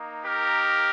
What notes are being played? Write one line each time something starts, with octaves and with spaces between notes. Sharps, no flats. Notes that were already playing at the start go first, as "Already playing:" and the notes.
Already playing: A#3 D#4
G4 A#4